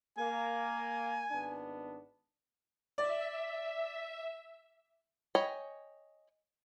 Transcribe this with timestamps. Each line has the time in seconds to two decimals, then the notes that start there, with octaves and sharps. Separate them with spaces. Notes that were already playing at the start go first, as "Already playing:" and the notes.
0.18 A#3 G#5
1.31 G#1 B3 D4
2.98 D5 E5
5.35 C#5 D#5 G5 G#5 B5